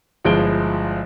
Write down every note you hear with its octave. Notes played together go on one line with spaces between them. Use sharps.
G1 F3 G#3 E4 D7 G7